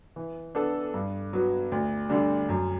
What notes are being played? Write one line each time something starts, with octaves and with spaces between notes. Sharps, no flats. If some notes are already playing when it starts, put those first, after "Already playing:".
E3
B3 D4 A4
G2
F#3 B3
D2
D3 G3 D4
F#2